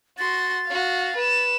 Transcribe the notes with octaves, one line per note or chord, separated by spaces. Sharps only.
F#4 C6 A6
F#4 F5
B4 E7